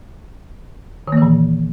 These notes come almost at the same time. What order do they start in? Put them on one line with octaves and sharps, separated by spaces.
D#3 A#3 E3 A#2